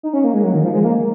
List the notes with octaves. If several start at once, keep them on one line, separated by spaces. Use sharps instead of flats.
D#4
C#4
A#3
G#3
F#3
D#3
F3
G#3
A#3